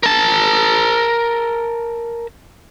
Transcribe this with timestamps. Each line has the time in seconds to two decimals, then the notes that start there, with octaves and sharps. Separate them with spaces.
0.03 A#4 A5